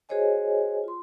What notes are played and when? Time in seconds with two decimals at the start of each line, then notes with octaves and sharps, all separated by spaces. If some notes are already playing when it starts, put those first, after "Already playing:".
0.09 F#4 G#4 C5 C#5 D#5 G#5
0.84 F4 C6